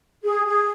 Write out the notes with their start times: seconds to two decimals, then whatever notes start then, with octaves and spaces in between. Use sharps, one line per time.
0.23 G#4
0.46 G#4